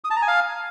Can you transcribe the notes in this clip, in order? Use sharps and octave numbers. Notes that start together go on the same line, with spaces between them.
D#6
A5
A#5
G#5
F5